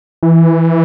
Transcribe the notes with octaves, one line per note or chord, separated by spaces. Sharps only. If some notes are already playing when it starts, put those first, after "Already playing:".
E3